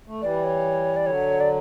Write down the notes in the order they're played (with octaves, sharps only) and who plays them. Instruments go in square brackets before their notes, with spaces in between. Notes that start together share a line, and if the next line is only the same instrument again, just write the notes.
[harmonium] A3
[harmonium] E3 G3 [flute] D5
[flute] C#5
D5
[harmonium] D3 F#3 [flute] C#5
[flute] D5